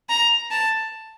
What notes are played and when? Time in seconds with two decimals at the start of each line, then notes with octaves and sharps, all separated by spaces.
0.09 A#5
0.51 A5